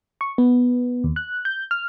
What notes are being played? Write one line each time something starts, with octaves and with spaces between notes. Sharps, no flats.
C#6
B3
D#2
F#6
G6
F6